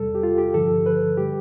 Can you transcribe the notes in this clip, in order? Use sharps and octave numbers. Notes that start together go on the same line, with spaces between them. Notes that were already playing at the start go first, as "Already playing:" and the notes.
Already playing: E2 C3 G3 A4
G4
F4
G4
G2 D3 F3 A4
B4
D3 G3 G4